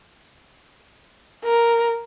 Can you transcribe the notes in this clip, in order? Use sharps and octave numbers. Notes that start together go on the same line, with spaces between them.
A#4